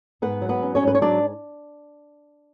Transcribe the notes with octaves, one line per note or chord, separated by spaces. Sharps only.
G#2 B3 B4
F#3
B3 B4
C#4
C#4 C#5
G#2
B4
C#5
F#3 D4 D5